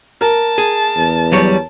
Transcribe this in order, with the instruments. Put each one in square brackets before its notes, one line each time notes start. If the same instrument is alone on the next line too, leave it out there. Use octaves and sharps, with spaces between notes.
[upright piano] A#4 [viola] A5
[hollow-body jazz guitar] G#4
[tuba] E2
[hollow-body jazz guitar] F#3 G3 C#5